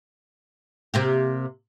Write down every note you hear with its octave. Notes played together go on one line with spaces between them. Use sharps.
C3 A#3 G4